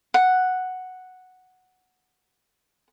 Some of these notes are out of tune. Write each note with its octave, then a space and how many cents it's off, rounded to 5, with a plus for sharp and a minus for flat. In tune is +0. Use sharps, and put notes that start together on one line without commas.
F#5 +0